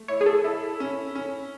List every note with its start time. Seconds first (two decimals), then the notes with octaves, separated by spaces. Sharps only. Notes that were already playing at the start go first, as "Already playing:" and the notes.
Already playing: A3
0.08 E4 C#5
0.21 G#4
0.26 A4
0.44 E4
0.80 C#4
1.15 C#4